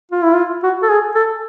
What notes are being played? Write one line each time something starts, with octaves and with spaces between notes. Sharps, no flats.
F4
E4
F4
F#4
A4
G#4
A4